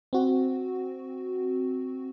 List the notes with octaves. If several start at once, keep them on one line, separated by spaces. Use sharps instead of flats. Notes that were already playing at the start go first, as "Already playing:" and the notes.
C4 F#4